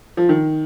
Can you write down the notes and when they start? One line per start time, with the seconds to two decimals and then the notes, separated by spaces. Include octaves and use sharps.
0.17 F3
0.29 D#3